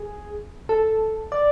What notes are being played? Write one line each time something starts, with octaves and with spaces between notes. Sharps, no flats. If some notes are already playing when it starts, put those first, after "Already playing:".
Already playing: G#4
A4
D5